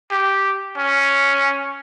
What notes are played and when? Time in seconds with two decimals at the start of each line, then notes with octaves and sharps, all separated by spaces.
0.11 G4
0.77 C#4